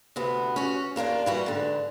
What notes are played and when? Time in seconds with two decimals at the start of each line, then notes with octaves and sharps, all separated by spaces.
0.16 D2 C3 B3
0.56 C#4 F#4
0.96 D#2 A#3 D4 F4
1.26 E3 G3 F#4
1.46 G#2 D3